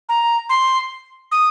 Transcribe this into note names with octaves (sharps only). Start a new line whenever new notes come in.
A#5
C6
D#6